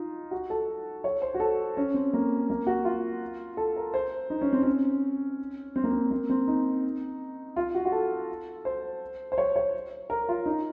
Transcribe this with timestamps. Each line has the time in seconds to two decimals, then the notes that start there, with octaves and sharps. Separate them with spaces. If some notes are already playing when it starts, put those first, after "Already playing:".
Already playing: D#4 F4
0.31 F#4
0.50 A4
1.04 C#5
1.22 C5
1.34 F#4
1.40 A4
1.77 C#4
1.94 C4
2.13 A#3
2.50 A#3
2.67 F#4
2.85 F4
3.57 A4
3.77 A#4
3.94 C5
4.30 D#4
4.41 C#4
4.52 C4
4.63 C#4
5.76 C4
5.84 A#3
5.92 C4
6.11 A#3
6.30 C4
6.47 D#4
7.56 F4
7.75 F#4
7.85 F#4
7.92 A4
8.65 C5
9.32 C5
9.38 C#5
9.56 C#5
10.10 A#4
10.29 F4
10.46 D#4